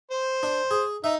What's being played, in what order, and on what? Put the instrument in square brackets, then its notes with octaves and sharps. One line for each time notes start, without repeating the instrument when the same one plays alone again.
[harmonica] C5
[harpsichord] D4
G#4
[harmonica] D#4 [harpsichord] E5